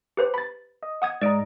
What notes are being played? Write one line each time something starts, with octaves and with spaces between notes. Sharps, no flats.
G4 B4 C5
B5 A6
D#5
F#5 D#6 G#6
G#2 D5 D#5 A#5 D7